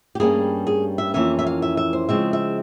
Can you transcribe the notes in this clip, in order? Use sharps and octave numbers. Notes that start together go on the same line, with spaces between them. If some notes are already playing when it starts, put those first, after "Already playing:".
G4
G2 G3 A#3 C#4 G#4
G#4
E5
F2 E3 A#3 C#4 E5
E5
F5
E5
E5
C5
C#3 F3 G#3 C4 E5
E5